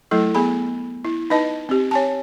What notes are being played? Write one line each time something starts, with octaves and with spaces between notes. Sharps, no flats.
F#3 A3 E4 A4
B3 G#4 B5
E4
D#4 B4 D#5 A5
C4 G4
C#5 G#5 A5